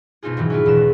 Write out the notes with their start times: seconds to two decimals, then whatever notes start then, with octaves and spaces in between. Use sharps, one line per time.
0.23 B2 C4 D#4 F4 G#4
0.37 G#2 D#3 E3 F#3
0.50 C#4 E4 F4
0.66 E2 B2 E7